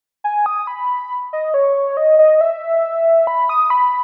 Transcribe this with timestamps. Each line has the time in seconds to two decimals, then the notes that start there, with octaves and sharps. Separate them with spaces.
0.24 G#5
0.46 D#6
0.67 B5
1.33 D#5
1.54 C#5
1.97 D#5
2.19 D#5
2.41 E5
3.27 B5
3.49 D#6
3.70 B5